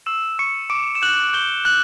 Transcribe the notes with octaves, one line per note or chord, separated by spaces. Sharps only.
C#6 E6 E7
C#6 E6 C#7
C#6 D6 D7
E7
F#6 G6 F#7
C#6 G6 G7
E6 F#6 F#7